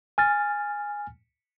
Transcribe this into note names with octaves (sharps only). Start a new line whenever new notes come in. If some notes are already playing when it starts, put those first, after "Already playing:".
G#5 F6 A6